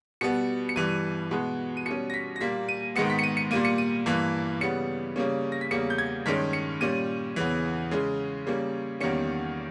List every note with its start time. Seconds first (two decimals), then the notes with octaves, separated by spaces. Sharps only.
0.21 B2 G3 B3 C#7
0.69 C#7
0.76 G2 E3 G3 D#7
1.31 B2 G#3 B3
1.77 D#7
1.86 B2 G3 C#4 C#7
2.10 A#6
2.14 B6
2.36 A#6
2.41 A#2 G3 A#3 B6
2.69 D#7
2.96 G#2 D#3 G#3 B3 C#7
3.10 B6
3.19 C#7
3.23 D#7
3.37 C#7
3.51 A#2 G3 A#3 D#7
3.65 C#7
3.78 D#7
4.06 G2 E3 A#3
4.61 C#3 G3 B3 C#7
5.16 C#3 G3 A#3 C#4
5.52 A#6
5.61 B6
5.71 E2 C#3 G3 A#3 C#7
5.90 G6
5.98 G#6
6.26 G2 D#3 G#3 C#4 B6
6.53 C#7
6.81 A#2 G3 C#4 D#7
7.36 E2 C#3 E3
7.91 C#3 G#3 C#4
8.46 C#3 G3 A#3 C#4
9.01 E2 D#3 G3 A#3 C#4 C#7